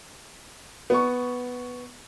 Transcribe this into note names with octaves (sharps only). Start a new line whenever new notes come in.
B3 C#6